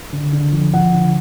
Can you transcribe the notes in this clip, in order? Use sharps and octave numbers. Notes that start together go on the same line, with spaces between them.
D3
D3
F3
F3 F#5
D3